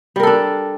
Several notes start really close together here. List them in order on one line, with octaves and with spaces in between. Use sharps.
G3 A#4 A4 D4